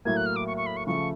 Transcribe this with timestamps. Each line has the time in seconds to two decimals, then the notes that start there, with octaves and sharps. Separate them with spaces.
0.05 A2 F#3 A#3 G#6
0.17 F#6
0.26 F6
0.36 D6
0.47 C#6
0.57 C#6
0.66 B5
0.77 C#6
0.87 C#3 F3 A3 C#6